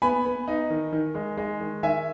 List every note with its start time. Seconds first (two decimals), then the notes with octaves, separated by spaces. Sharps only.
0.02 B3 G#5 B5
0.25 B3
0.48 D#4
0.70 D#3
0.93 D#3
1.15 G#3
1.37 G#3
1.60 D#3
1.83 D#3 E5 G#5